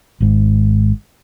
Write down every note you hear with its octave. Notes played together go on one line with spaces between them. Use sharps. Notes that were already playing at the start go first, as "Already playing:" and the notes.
G#1 G#2